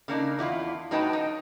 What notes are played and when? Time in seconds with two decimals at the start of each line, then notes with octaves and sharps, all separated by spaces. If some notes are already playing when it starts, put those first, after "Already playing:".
0.08 C#3 A#3 D4 D#4
0.39 E2 E4 F4 F5
0.91 A2 F#3 D#4 B4 G5 A5
1.13 D#4